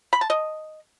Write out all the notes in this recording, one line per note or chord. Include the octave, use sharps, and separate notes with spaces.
B5
A5
D#5